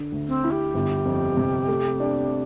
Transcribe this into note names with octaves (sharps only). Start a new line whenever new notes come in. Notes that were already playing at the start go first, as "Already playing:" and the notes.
Already playing: D3
D2
C4
E4
G4
G1
F2
C3
A3
D4